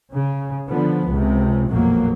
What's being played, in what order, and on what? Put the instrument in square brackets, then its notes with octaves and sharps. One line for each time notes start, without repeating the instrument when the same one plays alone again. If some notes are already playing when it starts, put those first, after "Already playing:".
[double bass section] C#3
D3 F3 B3
C#2 C3
A#1 F2 B2 F#3 A#3